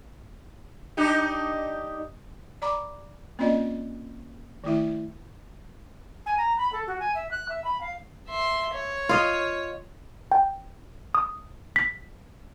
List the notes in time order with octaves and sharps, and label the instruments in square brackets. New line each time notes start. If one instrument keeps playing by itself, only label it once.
[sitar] D4 D#4 G4
[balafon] D5 A#5 B5 D6
A#3 C4 C#4 F4 D5 D#5
D#3 A3 E4 E5
[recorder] G#5
A#5
B5
A4
F#4
G#5
E5
F#6
E5
B5
F5
[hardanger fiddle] E5 C6
C#5
[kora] F4 D#5
[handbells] G5
D#6
B6